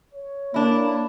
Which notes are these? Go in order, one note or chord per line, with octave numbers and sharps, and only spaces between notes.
C#5
A#3 D4 E4